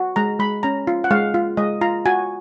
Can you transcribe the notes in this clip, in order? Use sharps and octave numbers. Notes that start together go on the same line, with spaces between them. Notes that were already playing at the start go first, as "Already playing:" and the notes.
Already playing: F#4
G#3 A#5
G#3 B5
C#4 A#5
F4
F#5
G#3 F5
F4
G#3 D#5
F4 A#5
F#4 G#5